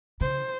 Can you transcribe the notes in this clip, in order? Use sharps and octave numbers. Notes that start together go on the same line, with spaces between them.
C#3 C5